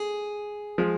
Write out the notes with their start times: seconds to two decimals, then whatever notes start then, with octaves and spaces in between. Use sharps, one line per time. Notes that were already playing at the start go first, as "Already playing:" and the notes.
Already playing: G#4
0.78 F3 G#3